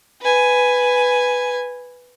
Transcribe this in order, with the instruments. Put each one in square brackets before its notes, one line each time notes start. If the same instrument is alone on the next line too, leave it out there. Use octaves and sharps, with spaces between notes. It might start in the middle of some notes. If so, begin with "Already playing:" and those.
[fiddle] B4 G#5